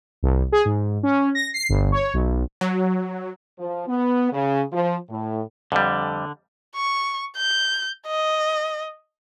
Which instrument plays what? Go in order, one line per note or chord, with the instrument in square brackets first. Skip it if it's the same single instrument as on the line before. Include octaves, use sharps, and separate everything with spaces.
[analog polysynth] C2
G#4
G#2
C#4
A#6
C7
G1
C#5
B1
[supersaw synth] F#3
[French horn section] F3
B3
C#3
F3
A2
[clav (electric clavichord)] F2 G3 [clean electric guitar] D3
[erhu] C#6
G6
D#5